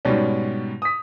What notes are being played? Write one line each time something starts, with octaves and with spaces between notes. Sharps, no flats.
G#2 B2 G3 C#4
D#6 B6